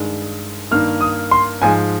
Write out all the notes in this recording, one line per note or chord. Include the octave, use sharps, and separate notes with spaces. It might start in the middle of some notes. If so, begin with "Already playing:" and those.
Already playing: G2 D#3 G#3
G2 D#3 A#3 F6
D#6
C6
G#2 F3 G#3 G#5